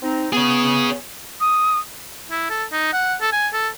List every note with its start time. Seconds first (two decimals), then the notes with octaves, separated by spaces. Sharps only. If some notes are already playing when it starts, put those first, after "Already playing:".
0.03 C4 D#4
0.33 B3 G#4 C#5
1.40 D#6
2.31 E4
2.50 A4
2.72 D#4
2.93 F#5
3.21 A4
3.32 G#5
3.53 A4